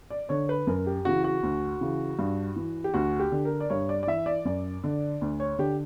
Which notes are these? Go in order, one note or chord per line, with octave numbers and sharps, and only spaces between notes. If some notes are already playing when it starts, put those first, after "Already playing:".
D5
D3 C#5
B4
F#2 A#4
G4
C#3 E3 F#4
F#4
D2
C#3 E3
G2
E3
G4
D2 F#4
G4
D3
A#4
D5
G2 C#5
D5
D5
E3 E5
D5
F#2 D5
D3
D2
C#5
D3 G4